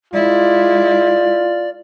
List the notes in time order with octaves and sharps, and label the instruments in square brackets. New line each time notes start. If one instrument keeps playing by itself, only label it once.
[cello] G#3 E4 [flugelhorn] F4 [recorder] D5